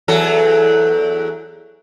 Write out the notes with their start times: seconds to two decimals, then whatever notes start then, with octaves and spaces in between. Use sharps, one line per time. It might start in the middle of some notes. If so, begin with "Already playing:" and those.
0.08 E2 F#3 A4